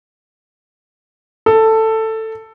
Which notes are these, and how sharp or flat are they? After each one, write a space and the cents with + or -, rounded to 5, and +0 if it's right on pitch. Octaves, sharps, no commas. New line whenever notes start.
A4 +10